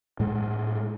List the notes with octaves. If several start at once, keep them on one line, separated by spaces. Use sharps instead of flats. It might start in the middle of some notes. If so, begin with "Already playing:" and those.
A2 G#3